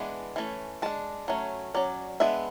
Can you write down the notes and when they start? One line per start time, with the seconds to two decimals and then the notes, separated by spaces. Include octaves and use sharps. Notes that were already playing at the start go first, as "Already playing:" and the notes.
Already playing: E3 G#3 B3 D4
0.36 E3 A3 C#4
0.82 G#3 D4 A5
1.28 F#3 A3 C#4
1.74 F#3 C#4 D5
2.20 G#3 B3 D4 E5